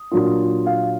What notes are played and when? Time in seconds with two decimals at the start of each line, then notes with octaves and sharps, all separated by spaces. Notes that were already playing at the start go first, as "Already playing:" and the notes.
Already playing: D#6
0.11 A#2 F#3 D4 F4
0.66 F5